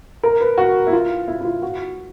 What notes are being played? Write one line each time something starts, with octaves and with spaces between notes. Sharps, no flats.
A#4
B4
F#4
E4
F4
E4
E4
F4
F#4